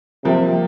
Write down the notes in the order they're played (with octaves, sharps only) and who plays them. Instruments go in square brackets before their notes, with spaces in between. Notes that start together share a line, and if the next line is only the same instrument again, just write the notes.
[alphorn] C3 [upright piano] F3 A#3